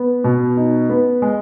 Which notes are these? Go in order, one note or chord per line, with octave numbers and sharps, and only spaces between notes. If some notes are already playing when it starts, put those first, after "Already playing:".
Already playing: B3
B2
D#4
B3
G#3